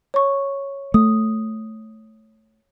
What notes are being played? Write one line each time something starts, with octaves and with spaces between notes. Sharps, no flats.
C#5 C#6
A3 D#6